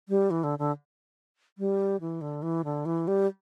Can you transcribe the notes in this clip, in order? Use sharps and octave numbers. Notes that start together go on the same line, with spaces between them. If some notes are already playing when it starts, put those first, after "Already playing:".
G3
E3
D3
D3
G3
E3
D3
E3
D3
E3
G3